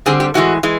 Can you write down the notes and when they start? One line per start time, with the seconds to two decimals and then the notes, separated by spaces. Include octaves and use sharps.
0.06 D3 G3 C4 G#4
0.20 G4
0.34 A2 E3 G#3 F#4
0.63 E3 G#3